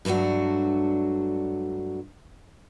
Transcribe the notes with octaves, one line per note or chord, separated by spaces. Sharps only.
G2 F#3 A3 D4 F#4